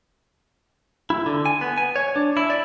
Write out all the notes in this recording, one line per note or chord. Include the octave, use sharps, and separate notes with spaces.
E4
D3
G#5
B3
G#5
C#5
D4
E4
D5